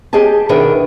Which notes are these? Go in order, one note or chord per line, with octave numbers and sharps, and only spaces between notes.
G4 G#4 D#5 G#5 A5
B2 D#3 B3 D4 A#4 E5